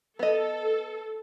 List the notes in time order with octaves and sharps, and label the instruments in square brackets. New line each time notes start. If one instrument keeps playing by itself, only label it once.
[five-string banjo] B3 D#5 [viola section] A4